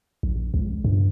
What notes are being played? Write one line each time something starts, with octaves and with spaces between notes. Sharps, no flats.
A#1
C#2
G2